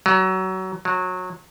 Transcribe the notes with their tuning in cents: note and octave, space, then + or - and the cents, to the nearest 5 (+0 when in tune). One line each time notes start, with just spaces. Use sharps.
F#3 +25
F#3 -20